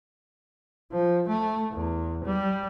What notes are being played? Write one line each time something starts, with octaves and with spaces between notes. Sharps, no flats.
F3
A3
E2
G3